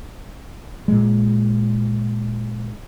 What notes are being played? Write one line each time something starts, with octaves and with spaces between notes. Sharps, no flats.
A#2 G#3